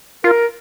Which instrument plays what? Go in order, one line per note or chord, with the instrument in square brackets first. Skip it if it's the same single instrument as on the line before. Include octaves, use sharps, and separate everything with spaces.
[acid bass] F4 [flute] A#4